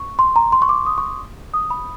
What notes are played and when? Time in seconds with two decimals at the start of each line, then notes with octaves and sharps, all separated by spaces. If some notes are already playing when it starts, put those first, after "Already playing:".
Already playing: C#6
0.19 C6
0.36 A#5
0.52 C6
0.62 C#6
0.69 D6
0.86 D#6
0.98 C#6
1.54 D#6
1.70 B5